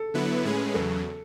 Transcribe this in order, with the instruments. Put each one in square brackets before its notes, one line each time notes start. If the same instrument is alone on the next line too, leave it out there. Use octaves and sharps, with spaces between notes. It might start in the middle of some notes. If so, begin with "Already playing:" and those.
Already playing: [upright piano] A4
[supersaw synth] D3 F#3 B3 E4 B4
A2 G#3 C#4 G#4 B4
[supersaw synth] E2 C#3 F#3 [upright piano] A4